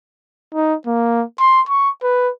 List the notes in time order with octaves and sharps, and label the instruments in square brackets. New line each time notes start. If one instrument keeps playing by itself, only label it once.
[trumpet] D#4
A#3
C6
C#6
B4